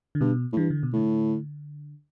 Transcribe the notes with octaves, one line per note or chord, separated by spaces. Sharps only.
D3
G2 B2
A2
G2 E3
D3
B2
A2 D3